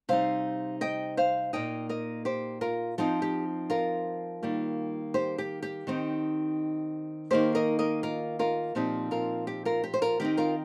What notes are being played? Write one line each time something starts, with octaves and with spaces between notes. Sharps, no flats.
C3 G3 D#4 C5 F5
D#5 G5
C5 F5
A#2 A#3 D#4 D#5 G5
A#4 D#5
G4 C5
F4 A#4
F3 C4 D#4 F4
G4
F4 A#4
D#3 G3 A#3
G4 C5
G4
G4
D#3 C4 D#4
D#3 A#3 D#4 G4 C5
A#4 D#5
A#4 D#5
F4 A#4
F4 A#4
A#2 F3 C4 D#4 G4
F4 A#4
G4
F4 A#4
G4
C5
F4 A#4
D#3 C4 D#4 G4
F4 A#4